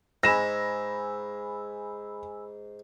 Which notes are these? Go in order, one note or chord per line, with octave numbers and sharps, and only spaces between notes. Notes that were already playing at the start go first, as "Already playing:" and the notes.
G#2 G#5 B5 E6 A#6 E7